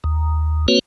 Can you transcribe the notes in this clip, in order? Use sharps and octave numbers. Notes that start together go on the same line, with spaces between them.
D#2
A#3 C4 F#4 B4 C#5